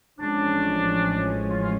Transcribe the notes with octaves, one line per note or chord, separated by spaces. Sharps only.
A1 A2 F3 G#3 C#4 D4
F4
F4